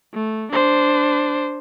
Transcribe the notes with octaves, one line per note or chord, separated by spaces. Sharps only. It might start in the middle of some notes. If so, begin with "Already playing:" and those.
A3
D4 C5